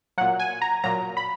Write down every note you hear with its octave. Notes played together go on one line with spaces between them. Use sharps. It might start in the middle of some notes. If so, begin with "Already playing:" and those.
A#2 F#3 F#5
G#5
A#5
A#2 F#3 A#5
B5